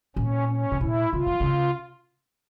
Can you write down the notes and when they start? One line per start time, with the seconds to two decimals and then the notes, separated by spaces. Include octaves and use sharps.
0.16 A#2 C#4
0.49 C#4
0.72 C3
0.81 A#2 E4
1.13 C#3 F4
1.27 E3
1.40 C#3